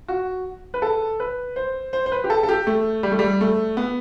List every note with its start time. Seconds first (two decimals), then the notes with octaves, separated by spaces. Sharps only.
0.08 F#4
0.74 B4
0.82 A4
1.20 B4
1.56 C5
1.93 C5
2.06 C5
2.12 B4
2.24 G4
2.30 A4
2.43 A4
2.49 G4
2.67 A3
3.03 G3
3.12 A3
3.19 G3
3.41 A3
3.77 B3